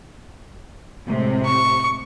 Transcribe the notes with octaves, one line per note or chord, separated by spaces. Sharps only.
A2 C3 G#3
C#6